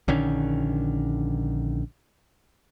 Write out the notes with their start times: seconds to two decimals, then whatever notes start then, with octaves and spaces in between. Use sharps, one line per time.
0.08 A#1 D3 D#3 C#4